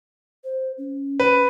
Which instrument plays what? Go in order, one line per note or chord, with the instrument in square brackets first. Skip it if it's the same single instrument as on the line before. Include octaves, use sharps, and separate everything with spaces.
[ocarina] C5
C#4
[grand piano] B4